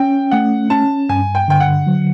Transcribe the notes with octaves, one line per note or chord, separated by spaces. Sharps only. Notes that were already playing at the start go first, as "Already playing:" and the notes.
Already playing: C#4 G5
A3 F#5
C#4 A5
G2 G#5
G5
D3 G5
F#5
F#3